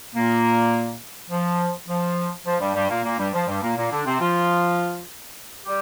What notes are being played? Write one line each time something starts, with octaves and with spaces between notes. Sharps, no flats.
A#2 A#3
F3
F3
F3
G2 G3
G2 G3
A#2 A#3
A#2 A#3
G2 G3
F3
G2 G3
A#2 A#3
A#2 A#3
D3 D4
C3 C4
F3 F4
G3 G4